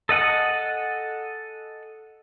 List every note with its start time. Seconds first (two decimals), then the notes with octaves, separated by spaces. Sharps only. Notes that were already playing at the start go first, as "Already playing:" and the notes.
0.09 A4 D#5 F#5 G#5